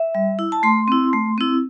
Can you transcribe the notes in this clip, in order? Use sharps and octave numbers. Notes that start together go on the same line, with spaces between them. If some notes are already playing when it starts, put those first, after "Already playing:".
Already playing: E5
G3
E4
A5
A3 C6
C4 E4
A3
C4 E4